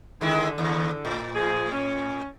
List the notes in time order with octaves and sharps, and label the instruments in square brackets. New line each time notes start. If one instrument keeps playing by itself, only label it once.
[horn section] D3 [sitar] D#3 G#3 E4
[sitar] D#2
A2
[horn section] F3 G#4
C#4